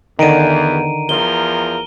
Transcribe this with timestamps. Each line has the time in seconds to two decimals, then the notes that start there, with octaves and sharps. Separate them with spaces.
0.19 E2 D3 D#3 A#5 D7 D#7
1.09 E2 F3 A#4 G7